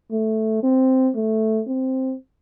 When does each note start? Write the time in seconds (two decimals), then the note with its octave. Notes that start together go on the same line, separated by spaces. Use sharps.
0.12 A3
0.63 C4
1.15 A3
1.67 C4